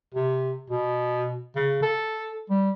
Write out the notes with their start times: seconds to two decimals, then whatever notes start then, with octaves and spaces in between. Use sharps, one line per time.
0.14 C3
0.70 B2
1.56 C#3
1.82 A4
2.50 G3